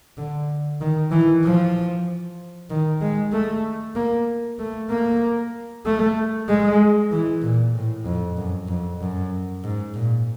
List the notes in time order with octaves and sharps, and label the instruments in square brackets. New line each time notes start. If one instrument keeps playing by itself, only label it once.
[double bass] D3
D#3
E3
F3
D#3
G#3
A3
A#3
A3
A#3
A3
G#3
E3
A#2
A2
F2
F#2
F2
F#2
G#2
A#2